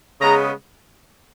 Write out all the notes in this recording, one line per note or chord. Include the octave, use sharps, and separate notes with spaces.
C#3 G#3 B3 A#5